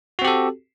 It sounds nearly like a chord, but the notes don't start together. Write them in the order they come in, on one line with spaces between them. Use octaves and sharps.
F#4 C4 G4 A4